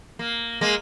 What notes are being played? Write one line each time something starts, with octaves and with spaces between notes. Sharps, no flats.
A#3
G#3 A#3